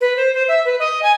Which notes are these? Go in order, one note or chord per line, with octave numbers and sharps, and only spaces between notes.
B4
C5
C5
E5
B4
D#5
G#5